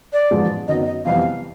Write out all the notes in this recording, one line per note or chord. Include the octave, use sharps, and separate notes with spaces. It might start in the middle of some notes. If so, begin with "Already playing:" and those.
D5
A1 G#2 F3 G#3
F#2 D#3 F#3 B3 D#5
D#5
F2 C3 E3 G3 B3 F5